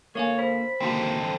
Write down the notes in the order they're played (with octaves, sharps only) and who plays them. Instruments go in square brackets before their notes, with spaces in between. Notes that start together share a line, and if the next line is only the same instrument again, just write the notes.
[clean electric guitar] D3 A#3 [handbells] A#4 F5 G#5 [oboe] C#5
[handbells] C5 [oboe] B5
[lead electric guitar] D3 C4 [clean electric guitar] D#3 F#3 A#3